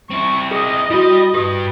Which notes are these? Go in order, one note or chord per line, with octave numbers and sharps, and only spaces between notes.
C4 E4 C#6
G#4 D#5 D#6
G3 E4 F#4 B5
G2 G4 B4 D#6